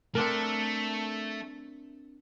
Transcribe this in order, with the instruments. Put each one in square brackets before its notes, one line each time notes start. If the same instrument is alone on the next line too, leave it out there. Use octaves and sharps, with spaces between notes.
[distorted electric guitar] A3 [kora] C4 D4 A#4